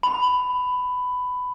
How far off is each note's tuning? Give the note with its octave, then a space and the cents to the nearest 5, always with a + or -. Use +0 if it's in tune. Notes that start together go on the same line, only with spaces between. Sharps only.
B5 +15